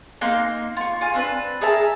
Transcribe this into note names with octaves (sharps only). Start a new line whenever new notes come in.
A#3 D#4 C6 F#6
F4 C#6
F4 G#5 F6
C4 D4 B4
G#4 A#4 E5 A5